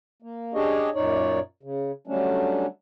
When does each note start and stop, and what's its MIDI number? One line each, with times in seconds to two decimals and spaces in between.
0.22 0.54 58
0.54 0.90 61
0.54 0.90 62
0.54 0.90 67
0.54 0.90 68
0.54 0.90 73
0.54 0.90 75
0.95 1.39 42
0.95 1.39 46
0.95 1.39 63
0.95 1.39 73
0.95 1.39 74
1.63 1.92 49
2.07 2.66 50
2.07 2.66 54
2.07 2.66 55
2.07 2.66 57
2.07 2.66 61
2.07 2.66 62